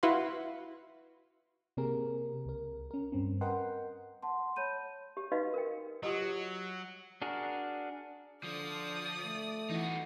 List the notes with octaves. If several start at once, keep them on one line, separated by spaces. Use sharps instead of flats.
E4 F#4 B4 F5 C6
C3 A#3 C4 G4 G#4 A#4
C#2 A#4
C#4 A#4
G2 C4 C#4
A#4 B4 D#5 F#5 G5 C6
F#5 A5 C6
C#5 B5 G6 D#7
G4
D#4 F#4 B4 D#5 F5
A#4 G5
F#3 F4 G4 D#5
D4 F#4 G#4 A#4
D3 F3 D5 D#6
A3
E3 D#4 F#4